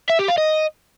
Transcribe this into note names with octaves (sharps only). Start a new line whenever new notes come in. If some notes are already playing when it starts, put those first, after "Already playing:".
E5
G4
F5
D#5